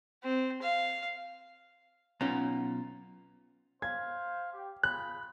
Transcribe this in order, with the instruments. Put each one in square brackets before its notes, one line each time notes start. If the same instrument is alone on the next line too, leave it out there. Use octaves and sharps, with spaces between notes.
[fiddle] C4
F5
[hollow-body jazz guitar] B1 C#4 [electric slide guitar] B3 F4 A#5
[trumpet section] C5 F5 [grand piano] G#6
[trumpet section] G4
[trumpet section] F4 G#4 B5 [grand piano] F#6